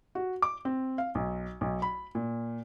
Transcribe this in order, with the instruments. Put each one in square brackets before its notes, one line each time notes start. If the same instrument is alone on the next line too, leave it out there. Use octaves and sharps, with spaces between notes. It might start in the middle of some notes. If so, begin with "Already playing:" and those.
[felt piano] F#4
D6
C4
F5
B1
B1
B5
A#2